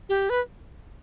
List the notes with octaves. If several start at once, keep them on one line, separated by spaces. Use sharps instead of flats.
G4
B4